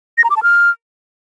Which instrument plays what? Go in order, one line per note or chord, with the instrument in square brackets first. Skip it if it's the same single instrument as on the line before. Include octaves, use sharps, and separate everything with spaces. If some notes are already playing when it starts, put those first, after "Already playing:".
[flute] A#6
A#5
D6
A5
F6